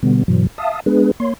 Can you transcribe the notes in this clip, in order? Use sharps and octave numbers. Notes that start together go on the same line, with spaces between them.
B2 D3 G3 B3
G2 B2 E3 F#3
E5 F5 A5 D#6
G#3 B3 D4 G#4 B4
A#3 C#5 C6